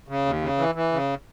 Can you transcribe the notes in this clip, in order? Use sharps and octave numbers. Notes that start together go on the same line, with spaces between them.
C#3
D#2
C#3
E3
E3
C#3